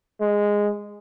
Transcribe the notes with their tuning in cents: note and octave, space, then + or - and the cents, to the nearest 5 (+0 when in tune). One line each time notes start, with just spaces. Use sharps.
G#3 -10